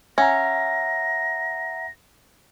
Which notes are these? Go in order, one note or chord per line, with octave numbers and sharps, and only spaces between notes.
C#4 E5 F#5 A#5 A#6